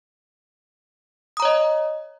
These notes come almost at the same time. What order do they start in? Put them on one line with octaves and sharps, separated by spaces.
D#6 A#5 C#5 D#5